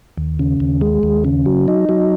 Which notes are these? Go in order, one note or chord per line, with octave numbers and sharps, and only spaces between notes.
D#2
C#3
D#2
G#3
D#2
C#3
F#3
D#4
F#3